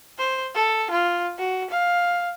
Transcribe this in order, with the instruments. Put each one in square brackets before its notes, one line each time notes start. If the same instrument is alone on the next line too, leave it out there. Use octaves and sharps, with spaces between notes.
[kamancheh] C5
A4
F4
F#4
F5